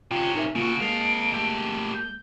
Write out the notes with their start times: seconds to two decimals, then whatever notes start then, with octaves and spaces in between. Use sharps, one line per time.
0.11 C3 C#4 F4 G5
0.35 D#4 A#4 E5
0.55 C#3 A#3 F4 F#4 D7
0.81 G#3 A#3 A4 F5
1.33 A3 G4
1.94 G6